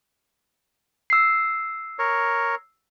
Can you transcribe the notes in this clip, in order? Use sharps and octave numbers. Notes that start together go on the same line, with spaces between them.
E6 C7
A#4 C#5